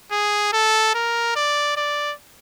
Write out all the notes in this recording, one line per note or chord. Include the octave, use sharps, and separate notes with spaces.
G#4
A4
A#4
D5
D5